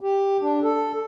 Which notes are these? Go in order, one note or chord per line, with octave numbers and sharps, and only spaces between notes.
G4
D4
A4